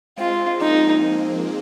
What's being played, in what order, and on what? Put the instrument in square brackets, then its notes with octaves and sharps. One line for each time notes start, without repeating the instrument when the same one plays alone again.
[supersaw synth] G#3 C4 [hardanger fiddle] F4
[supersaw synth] F3 A#3 [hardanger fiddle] D#4